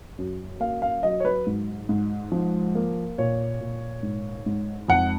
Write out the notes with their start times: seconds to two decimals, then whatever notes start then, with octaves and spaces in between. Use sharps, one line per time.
0.18 F#2
0.60 A#3 F5
0.82 F5
1.03 F#3 D#5
1.20 C#5
1.25 B4
1.47 G#2
1.89 G#2
2.32 F3
2.75 A#3
3.18 A#2 C#5
3.61 A#2
4.03 G#2
4.46 G#2
4.88 F2 F#5